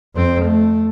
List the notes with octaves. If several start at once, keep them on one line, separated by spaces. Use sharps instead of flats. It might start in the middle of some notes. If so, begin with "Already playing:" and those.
F2 C4
A3